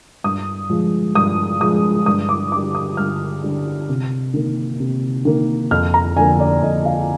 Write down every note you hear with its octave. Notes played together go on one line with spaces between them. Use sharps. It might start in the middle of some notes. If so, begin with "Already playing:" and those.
G2 D#6
F3 G#3
G2 D#6
F3 G#3 D#6
G2 D#6
D6
D3 G3 D6
D#6
G2 F6
D3 G3
C3
D#3 A#3
C3
D#3 A#3
F2 F6
A#5
D3 F3 A#3 G#5
D5
F2 D#5
F5